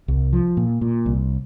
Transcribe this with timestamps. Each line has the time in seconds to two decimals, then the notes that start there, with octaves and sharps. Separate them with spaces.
0.08 C2
0.33 F3
0.57 A#2
0.81 A#2
1.06 C2